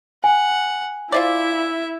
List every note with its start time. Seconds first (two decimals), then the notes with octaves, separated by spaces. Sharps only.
0.24 F#5 G#5
1.12 E4 F4 C5 D5 E5